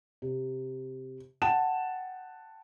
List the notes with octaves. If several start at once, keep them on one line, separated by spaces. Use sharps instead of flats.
C3
F#5 G5 A5 E7